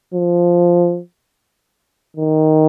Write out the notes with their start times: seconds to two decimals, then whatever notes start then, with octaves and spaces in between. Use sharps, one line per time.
0.14 F3
2.17 D#3